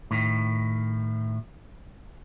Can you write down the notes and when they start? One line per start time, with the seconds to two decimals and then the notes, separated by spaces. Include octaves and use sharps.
0.11 A2 D#3